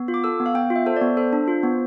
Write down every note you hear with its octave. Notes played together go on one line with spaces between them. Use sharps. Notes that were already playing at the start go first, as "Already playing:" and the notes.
Already playing: B3
F4
D6
A4 E6
B3
F5
B3 G5
F4
E5
A4 C5
D5
B3
A4 C5
D4
F4
B3